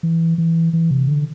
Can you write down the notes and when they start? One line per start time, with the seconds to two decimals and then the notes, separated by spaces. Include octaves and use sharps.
0.03 E3
0.38 E3
0.73 E3
0.91 C3
1.08 D3